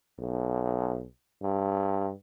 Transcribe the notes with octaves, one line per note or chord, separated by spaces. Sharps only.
B1
G2